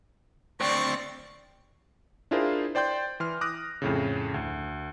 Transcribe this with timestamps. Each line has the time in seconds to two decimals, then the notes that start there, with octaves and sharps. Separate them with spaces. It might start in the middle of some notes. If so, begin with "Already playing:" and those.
0.61 D2 C4 D5 C#6
2.31 D4 E4 F4 G#4 A#4 C5
2.75 C5 D5 G5 C6 G6
3.20 E3 C6 F6
3.41 D6 D#6 F#6 A#6
3.82 F2 A2 C#3
4.34 D2